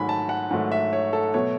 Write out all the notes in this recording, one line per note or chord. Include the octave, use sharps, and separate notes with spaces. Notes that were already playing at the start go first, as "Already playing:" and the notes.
Already playing: G#2 D#3 F#3 A3 G#5 B5
A5
F#5
G#2 D#3 F#3 A3
E5
C#5
A4
B2 F#3 A3 C#5